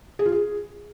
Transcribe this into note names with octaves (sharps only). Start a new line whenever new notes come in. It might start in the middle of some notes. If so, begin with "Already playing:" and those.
G#4
F4
G#4